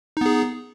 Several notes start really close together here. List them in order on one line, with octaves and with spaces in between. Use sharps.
D#4 B3 G#4